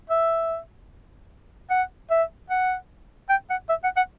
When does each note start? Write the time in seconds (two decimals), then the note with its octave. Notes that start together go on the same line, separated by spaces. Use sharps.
0.10 E5
1.70 F#5
2.10 E5
2.50 F#5
3.29 G5
3.50 F#5
3.69 E5
3.84 F#5
3.96 F#5